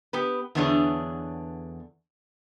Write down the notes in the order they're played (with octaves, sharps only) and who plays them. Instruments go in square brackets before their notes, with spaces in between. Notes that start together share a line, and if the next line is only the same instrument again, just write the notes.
[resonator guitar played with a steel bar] B3 G4 B4
E2 D3 B3 D4 G#4 C#5